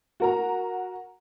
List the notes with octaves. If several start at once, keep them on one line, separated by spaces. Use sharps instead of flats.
F#4 A#4 A#5